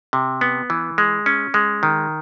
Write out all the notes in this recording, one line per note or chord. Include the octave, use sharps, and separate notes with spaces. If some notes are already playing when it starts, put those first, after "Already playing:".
C3
B3
E3
G#3
C#4
G#3
D#3